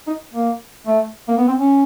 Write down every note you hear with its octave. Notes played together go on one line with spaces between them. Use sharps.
D#4
A#3
A3
A#3
B3
C4
C#4